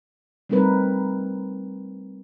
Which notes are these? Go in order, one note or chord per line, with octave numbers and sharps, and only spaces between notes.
G3 A3 C4 D#4 A#4 B4